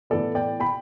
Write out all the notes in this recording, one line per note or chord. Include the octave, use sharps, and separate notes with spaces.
A2 E3 B3 A4 D5
D5 G5
G5 B5